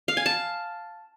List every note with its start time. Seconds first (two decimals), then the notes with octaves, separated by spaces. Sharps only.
0.08 F5
0.17 G#5
0.26 A5